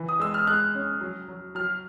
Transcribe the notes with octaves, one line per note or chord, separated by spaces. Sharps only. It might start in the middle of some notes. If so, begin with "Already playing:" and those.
Already playing: E3
D#6
G#3 E6
F6
G#3 F#6
C#4
F#3
F#3
F#3 F6